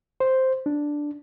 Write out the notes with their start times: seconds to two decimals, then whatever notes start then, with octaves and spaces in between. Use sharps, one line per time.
0.20 C5
0.66 D4